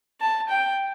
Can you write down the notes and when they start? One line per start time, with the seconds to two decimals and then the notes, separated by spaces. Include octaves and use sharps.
0.21 A5
0.49 G5